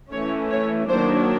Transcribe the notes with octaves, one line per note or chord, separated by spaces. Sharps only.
E3 A3 C#4 C#5
C#5
D#3 F#3 A#3 D4 C5